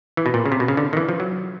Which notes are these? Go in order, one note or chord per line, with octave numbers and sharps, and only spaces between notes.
E3
B2
A#2
C#3
C3
B2
C#3
D3
D#3
E3
F3
F#3